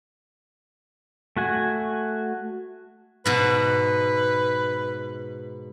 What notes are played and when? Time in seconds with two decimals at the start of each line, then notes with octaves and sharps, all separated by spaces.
1.37 A3 F#4 G#5
3.26 G#2 B2 B4